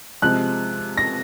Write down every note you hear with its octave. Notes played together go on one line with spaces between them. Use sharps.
C3 F3 G#3 F#6
A#6